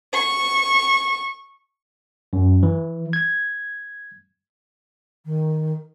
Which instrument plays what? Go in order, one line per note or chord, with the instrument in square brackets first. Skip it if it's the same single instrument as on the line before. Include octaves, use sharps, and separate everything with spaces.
[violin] C#6
[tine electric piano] F#2
E3
G#6
[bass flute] D#3